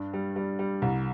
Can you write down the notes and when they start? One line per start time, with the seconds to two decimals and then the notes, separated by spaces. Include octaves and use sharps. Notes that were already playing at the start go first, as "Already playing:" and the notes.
Already playing: G2 D4
0.13 G3
0.36 G3
0.59 G3
0.82 C2